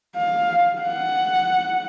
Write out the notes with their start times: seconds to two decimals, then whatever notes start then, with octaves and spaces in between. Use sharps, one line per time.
0.17 F5
0.81 F#5